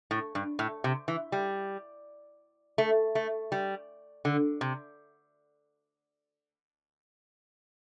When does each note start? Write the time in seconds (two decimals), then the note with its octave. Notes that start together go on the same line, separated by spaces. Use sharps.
0.11 A2
0.35 G2
0.59 A2
0.84 C3
1.08 E3
1.32 G3
2.78 A3
3.15 A3
3.52 G3
4.25 D3
4.61 C3